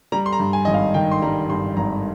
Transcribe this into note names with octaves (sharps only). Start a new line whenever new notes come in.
G3 A#5
C6
A#5
G2
G#5
G#1 D#5
F5
D#3 G5
C6
G3 A#5
G2 C6
G#1 A#5